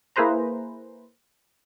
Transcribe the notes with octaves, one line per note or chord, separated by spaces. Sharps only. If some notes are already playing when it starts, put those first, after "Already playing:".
A#3 E4 G#4 B4 C5 A#5